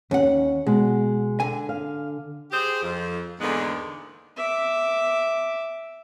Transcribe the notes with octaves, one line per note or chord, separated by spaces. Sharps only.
D#2 C#4 F#5
B2 G#3 F#5
D3 G#5
F5
G4 G#4 C5
F2
E2 G#2 D3 G#3 A#3 B3
E5 D6